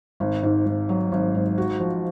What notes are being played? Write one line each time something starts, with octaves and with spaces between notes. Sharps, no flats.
G#1
G#2
G#1
F#3
G#1
G#2
F#4
F3